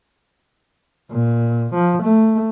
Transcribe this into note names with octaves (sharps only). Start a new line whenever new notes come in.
A#2
F3
A3